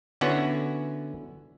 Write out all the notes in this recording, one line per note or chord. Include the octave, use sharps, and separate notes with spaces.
D3 B3 C#4 E4 F#4 B4